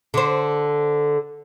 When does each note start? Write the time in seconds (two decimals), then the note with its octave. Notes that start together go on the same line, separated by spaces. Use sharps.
0.14 D3 C5